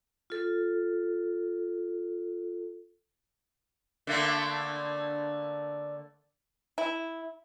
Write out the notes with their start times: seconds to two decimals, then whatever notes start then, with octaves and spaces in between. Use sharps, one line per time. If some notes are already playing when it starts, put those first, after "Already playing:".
0.30 F4 A4
4.07 D3 A3 A#3
6.78 E4